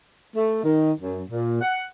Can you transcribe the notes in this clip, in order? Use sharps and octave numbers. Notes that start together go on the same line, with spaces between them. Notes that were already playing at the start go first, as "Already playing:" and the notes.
A3
D#3
F#2
A#2
F#5